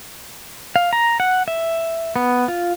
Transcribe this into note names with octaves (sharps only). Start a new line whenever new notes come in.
F5
A#5
F#5
E5
B3
F4